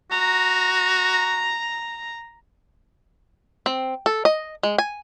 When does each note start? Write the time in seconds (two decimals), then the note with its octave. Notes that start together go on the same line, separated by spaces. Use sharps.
0.11 F#4 A#5
3.66 C4
4.06 A4
4.25 D#5
4.63 G#3
4.78 G#5